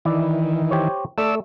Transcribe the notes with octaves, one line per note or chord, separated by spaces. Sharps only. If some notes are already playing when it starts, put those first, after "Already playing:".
D#3 E3 E4 D5
G4 C5 C#5
A3 A4 D5 E6